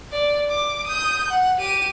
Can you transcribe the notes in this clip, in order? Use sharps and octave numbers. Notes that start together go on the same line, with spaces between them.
D5
D6
D#6 G6
F#5
G4 D#7